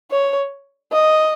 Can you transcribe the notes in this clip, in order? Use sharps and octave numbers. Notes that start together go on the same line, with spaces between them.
C#5
D#5